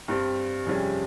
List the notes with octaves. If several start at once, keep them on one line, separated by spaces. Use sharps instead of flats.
G2 G3 C4
F2 C3 G3 C#4 G#4